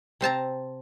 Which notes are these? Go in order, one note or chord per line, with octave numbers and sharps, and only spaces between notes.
C3 C4 A5 A#5